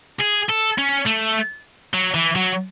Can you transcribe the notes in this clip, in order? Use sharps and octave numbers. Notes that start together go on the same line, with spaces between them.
G#4
A4
C#4
A3
F#3
E3
F#3